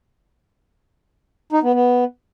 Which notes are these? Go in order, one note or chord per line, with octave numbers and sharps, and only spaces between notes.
D#4
B3
B3